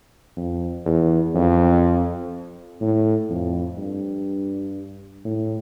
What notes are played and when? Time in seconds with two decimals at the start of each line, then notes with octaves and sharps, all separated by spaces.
0.37 F2
0.86 E2
1.35 F2
2.81 A2
3.30 F2
3.78 G2
5.25 A2